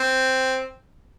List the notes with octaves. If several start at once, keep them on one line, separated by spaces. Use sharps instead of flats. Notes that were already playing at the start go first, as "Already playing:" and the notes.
Already playing: C4